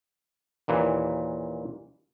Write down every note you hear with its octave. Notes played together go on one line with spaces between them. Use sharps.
D#2 A#2 E3